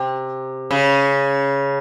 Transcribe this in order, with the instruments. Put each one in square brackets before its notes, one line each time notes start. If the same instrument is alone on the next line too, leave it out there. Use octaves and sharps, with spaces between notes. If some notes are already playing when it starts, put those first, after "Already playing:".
Already playing: [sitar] C3
C#3